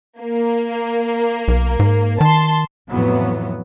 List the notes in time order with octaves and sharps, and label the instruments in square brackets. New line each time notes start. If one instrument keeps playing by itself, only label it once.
[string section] A#3
[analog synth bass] B1
G#2
[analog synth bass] D#3 [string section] A5 C6
[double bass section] F2 A2 E3 F#3 B3